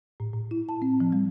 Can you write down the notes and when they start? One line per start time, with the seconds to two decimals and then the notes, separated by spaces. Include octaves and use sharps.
0.20 A2
0.33 A2
0.51 E4
0.69 A5
0.82 C4
1.00 F3
1.12 G3